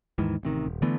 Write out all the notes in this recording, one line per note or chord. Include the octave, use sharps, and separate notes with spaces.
D#2 G#2 D#3 E3
A1 C3 D#3
D#1
D3 E3 A3 B3